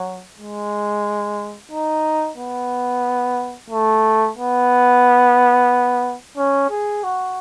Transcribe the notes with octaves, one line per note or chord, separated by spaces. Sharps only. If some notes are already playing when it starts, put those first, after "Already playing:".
Already playing: F#3
G#3
D#4
B3
A3
B3
C#4
G#4
F#4